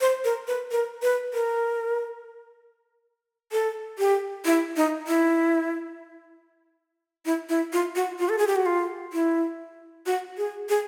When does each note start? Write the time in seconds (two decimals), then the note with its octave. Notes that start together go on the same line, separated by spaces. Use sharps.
0.01 C5
0.24 A#4
0.47 B4
0.71 A#4
1.02 B4
1.34 A#4
3.52 A4
3.99 G4
4.45 E4
4.76 D#4
5.08 E4
7.26 E4
7.49 E4
7.73 F4
7.96 F#4
8.19 F4
8.29 A4
8.38 G#4
8.47 G4
8.56 F#4
8.66 F4
9.13 E4
10.06 F#4
10.38 G#4
10.69 G#4